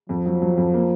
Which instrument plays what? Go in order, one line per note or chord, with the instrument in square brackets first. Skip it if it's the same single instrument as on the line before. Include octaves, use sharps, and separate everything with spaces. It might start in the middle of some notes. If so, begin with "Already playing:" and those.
[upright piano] F2 [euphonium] F3
[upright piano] F#3
F#3
F2
A#3